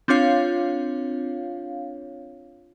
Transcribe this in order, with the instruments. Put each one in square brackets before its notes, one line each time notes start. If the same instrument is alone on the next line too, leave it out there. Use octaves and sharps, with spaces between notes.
[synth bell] C4 D4 F4 C#5 F5